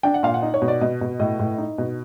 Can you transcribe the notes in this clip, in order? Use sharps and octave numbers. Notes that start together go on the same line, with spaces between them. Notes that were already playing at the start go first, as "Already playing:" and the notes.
D4 G5
F#5
A#2 F5
F#5
D#4
C#5
B2
D5
B2 D#5
B2
A2 D#5
A2
D#4
B2